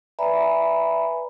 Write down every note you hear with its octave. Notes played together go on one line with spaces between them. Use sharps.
B4 D5 E5 G#5 A#5 B5